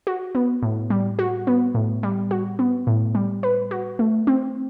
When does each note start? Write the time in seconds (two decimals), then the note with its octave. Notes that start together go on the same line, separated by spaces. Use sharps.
0.07 F#4
0.35 B3
0.63 A2
0.90 G3
1.19 F#4
1.47 B3
1.75 A2
2.03 G3
2.31 F#4
2.59 B3
2.87 A2
3.15 G3
3.43 B4
3.71 F#4
3.99 A3
4.27 C4